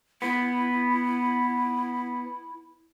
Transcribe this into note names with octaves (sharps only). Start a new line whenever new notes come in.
B3 E4